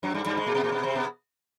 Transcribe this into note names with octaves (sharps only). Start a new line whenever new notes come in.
F#2 F#3
G2 G3
G2 G3
G#2 G#3
A#2 A#3
B2 B3
A#2 A#3
B2 B3
C3 C4
B2 B3